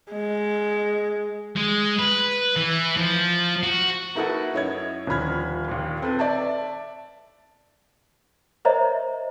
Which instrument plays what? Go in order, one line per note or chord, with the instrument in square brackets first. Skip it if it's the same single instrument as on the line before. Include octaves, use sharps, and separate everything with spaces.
[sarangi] G#3
[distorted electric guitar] G#3
B4
E3
F3
F#4
[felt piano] A#3 D#4 E4 F#4 A4 B4
F#2 E4 C#5 D#5 G#6
D#1 D3 F3 B5 F6 G#6
D#2 A#2
C4 A4 B4
D5 E5 A5
[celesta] A#4 C5 C#5 D#5 E5 A#5